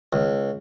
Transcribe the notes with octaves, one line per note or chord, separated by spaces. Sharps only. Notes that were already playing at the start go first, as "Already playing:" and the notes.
C#2